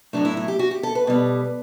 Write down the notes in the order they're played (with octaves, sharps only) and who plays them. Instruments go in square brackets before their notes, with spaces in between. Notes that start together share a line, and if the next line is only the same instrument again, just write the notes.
[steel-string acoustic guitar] A2 F#3 A3 D4
E4
E4
G4
F#4
G4
A4
B4
B2 G3